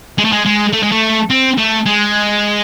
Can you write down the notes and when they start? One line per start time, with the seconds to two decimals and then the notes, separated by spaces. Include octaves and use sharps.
0.18 G#3
0.25 A3
0.32 G#3
0.46 G#3
0.73 A3
0.83 G#3
0.92 A3
1.30 C4
1.58 A3
1.86 G#3